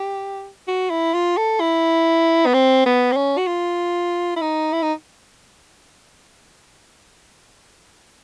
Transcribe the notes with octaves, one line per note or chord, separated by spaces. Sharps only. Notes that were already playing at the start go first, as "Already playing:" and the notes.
Already playing: G4
F#4
E4
F4
A4
E4
B3
C4
B3
C4
C#4
F#4
F4
E4
D#4
E4
D#4